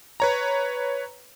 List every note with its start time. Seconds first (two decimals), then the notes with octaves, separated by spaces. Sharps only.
0.20 B4 C#5 A#5